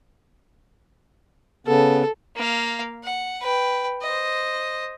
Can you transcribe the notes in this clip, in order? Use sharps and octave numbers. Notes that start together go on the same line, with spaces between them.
C#3 B3 A4
A#3 F5
F#5
B4 G5
C5 D#5